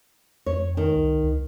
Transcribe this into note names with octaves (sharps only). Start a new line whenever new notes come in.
F2 C#5
D#3
C2
C#2